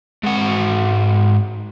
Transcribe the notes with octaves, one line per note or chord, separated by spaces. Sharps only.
G#2 F#4